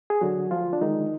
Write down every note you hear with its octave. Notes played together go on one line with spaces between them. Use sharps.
G#4
D3 F#3 F#4
D2 F3 F4
D4
D3 D#3 G#3 D#4